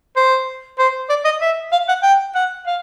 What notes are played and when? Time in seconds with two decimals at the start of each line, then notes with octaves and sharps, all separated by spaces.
0.16 C5
0.79 C5
1.09 D5
1.25 D#5
1.41 E5
1.72 F5
1.88 F#5
2.03 G5
2.35 F#5
2.67 F5